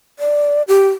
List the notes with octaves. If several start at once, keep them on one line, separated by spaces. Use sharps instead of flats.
D5
G4